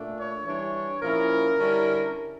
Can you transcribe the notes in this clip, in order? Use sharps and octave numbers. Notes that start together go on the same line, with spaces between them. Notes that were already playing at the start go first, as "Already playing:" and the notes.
Already playing: A#2 A3 D4
C#5
E3 G3 D4 C#5
A#2 F3 C#4 E4 A#4
D3 G3 C#4 E4